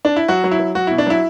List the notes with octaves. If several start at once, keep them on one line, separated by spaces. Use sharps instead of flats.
D4
E4
F#3 F#4
F#3
E4
F#3
F#3 F#4
B2 E4
D4
F#3 E4